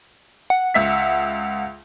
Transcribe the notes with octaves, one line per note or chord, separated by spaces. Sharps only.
F#5
C#2 E5 B6